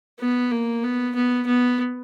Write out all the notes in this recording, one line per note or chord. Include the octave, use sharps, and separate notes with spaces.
B3
A#3
B3
B3
B3